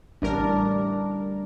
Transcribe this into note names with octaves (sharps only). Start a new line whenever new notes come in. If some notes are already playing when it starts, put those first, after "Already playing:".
A1 G3 D4 A#4